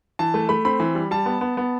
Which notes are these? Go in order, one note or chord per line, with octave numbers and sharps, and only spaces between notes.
E3 A5
A3
A3 B5
C4 B5
E3
G3
G3 A5
B3
B3
B3